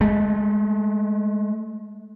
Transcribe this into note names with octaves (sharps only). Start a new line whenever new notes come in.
G#3 A3